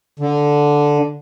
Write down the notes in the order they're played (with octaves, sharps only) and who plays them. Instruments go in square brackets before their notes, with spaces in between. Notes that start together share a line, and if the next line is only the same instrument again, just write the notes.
[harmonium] D3